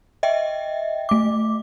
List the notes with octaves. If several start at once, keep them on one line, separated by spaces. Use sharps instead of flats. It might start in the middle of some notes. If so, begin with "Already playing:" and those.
D#5 E5 G5
A3 D6